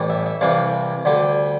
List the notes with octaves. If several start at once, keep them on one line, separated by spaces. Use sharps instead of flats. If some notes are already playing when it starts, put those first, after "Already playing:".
Already playing: A1 A2 E3 G3
E5
E5
C2 C3 E3 G3 F5
D2 D3 G3